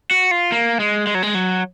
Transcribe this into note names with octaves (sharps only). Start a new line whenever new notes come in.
F#4
F4
A#3
G#3
G#3
F#3
G#3
F#3